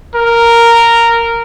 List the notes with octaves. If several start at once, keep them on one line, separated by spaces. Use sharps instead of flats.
A#4